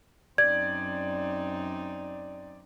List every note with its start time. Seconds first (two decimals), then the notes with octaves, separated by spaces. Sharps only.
0.38 F#2 C4 D#4 D5 G#6